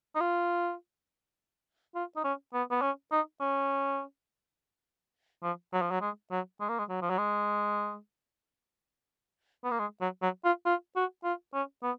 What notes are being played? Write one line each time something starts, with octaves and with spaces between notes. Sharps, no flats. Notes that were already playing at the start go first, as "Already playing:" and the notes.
D#4
F4
F4
D#4
C#4
B3
B3
C#4
D#4
C#4
F3
F#3
F3
F#3
G#3
F#3
G#3
A#3
G#3
F#3
F3
F#3
G#3
B3
A#3
G#3
F#3
F#3
F4
F4
F#4
F4
C#4
B3